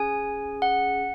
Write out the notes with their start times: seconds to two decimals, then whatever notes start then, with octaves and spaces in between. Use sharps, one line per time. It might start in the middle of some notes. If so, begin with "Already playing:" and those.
Already playing: C#4 G#4 G#5
0.62 F#5